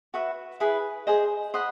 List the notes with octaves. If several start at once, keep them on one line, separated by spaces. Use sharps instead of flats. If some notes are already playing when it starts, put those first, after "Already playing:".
F#4 B4 E5
E4 G#4 B4
G#4 C5 D#5
C5 D#5 F#5 B5